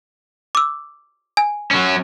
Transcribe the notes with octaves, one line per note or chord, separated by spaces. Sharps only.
D6 E6
G#5
F#3 C#4